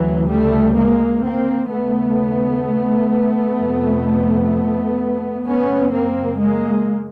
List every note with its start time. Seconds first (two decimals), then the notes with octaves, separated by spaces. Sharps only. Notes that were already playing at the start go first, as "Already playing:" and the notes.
Already playing: D2 C#3 E3 F#3
0.29 G3 A3
0.75 G#3 A#3
1.22 A#3 C4
1.69 D#2 C#3 A3 B3
3.58 F2 C3
5.45 F#2 C#3 B3 C#4
5.92 A#3 C4
6.39 G#3 A#3